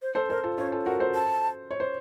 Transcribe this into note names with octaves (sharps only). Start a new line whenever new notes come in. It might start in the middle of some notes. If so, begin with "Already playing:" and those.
C5
A4 C5
A4 A#4 C5
F4 A4
C#4 F4 C#5
F4 A4
F#4 A#4 F#5
A4 C5
A5
C#5
C5